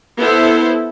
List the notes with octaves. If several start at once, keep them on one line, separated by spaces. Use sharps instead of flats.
B3 E4 A4 C5